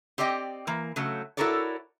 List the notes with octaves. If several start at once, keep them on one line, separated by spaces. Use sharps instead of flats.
C4 G4 D5 D#5 G5
E3 A#3
C#3 F#3 A3
E4 F#4 A4 A#4 C#5 D5